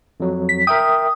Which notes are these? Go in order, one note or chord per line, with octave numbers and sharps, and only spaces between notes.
F2 F#3
B6
A#4 E5 G5 D#6